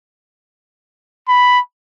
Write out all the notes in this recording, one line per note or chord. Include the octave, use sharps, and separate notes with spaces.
B5